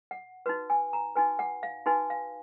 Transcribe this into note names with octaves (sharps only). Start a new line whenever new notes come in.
F#5
D#4 F#4 B4
G#5
A#5
D#4 F#4 B4 G#5
F#5
F5
D#4 F#4 B4 G#5
F5